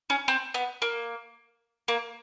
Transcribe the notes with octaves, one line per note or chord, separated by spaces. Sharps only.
C#4
C4
B3
A#3
A#3